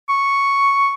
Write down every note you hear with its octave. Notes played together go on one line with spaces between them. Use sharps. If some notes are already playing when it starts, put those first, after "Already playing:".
C#6